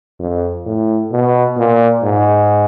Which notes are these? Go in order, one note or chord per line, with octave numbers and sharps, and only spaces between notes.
F2
A2
B2
A#2
G#2